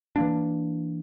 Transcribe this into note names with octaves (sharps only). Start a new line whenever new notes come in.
E3 A#3 D4